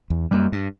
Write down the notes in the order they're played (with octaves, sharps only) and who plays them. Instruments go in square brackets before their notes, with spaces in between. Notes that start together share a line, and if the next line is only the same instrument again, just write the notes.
[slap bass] E2
[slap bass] F#2 [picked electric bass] G3 A#3
[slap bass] G2